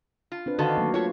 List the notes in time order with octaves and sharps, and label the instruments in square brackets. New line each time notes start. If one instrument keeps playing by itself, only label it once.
[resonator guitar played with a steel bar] F4
[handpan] C4 D4 B4
[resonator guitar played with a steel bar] D3 D#3 A4 [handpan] F#4 F5
[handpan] F#3 A3 A#3
[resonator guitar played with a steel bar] A3 C#5 [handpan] F4